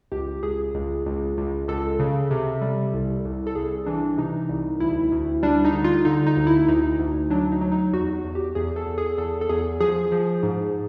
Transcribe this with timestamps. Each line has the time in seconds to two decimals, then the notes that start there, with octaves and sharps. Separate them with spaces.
0.12 C#2 G4
0.43 C#2 G#4
0.75 C#2
1.06 C#2
1.38 C#2
1.68 C#2 A4
1.99 C#3
2.31 C3
2.62 G3
2.94 C2
3.25 C2
3.47 A4
3.55 C2 G#4
3.86 E3 D4
4.18 C3 D#4
4.49 C2
4.80 D2 E4
5.12 D2
5.43 G3 D4
5.65 D#4
5.74 D3
5.84 F4
6.05 D3 D#4
6.27 D#4
6.37 D2
6.47 E4
6.68 D2 D#4
6.99 D2
7.30 F#3 D4
7.52 D#4
7.61 F#3
7.72 D#4
7.93 E2 F#4
8.13 F#4
8.24 E2
8.35 G4
8.55 E2 G#4
8.76 A4
8.87 E2
8.98 G#4
9.18 E2 A4
9.41 A4
9.49 E2 G#4
9.80 F3 G#4
10.12 F3
10.43 G#2